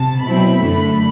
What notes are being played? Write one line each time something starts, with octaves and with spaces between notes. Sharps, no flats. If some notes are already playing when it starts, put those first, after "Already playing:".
Already playing: C3 A5
B2 F#3 C4 E4 B5
F#2 D3 A3